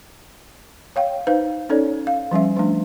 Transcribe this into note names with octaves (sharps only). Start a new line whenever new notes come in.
C#5 F5 G5
D#4 B4 C5 F5
C#4 D#4 A4 C#5 D5
F5
F3 G3 C#4 E5
F3 A3 D4